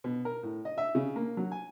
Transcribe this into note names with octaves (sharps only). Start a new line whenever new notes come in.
B2
A#4
A2
D#5
E5
C#3
A#3
F#3
G#5